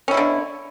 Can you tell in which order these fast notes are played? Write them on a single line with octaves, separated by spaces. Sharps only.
C#4 E4 B2 D3